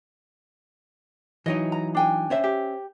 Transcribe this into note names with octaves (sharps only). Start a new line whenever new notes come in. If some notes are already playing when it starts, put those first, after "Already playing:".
E3 F#3 D#4 D#5
A#5
D4 G5 G#5
C#4 C5 E5
G4